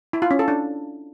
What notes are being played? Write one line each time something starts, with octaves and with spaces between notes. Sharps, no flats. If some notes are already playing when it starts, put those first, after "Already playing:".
E4
F4
C#4
A4
D4